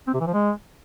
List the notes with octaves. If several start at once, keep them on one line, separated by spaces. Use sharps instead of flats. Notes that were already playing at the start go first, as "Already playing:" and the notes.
C4
C3
E3
F3
G#3